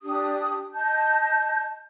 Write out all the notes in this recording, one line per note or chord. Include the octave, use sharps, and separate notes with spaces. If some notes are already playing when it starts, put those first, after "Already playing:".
D4 G4 D#6
D#5 A5 G6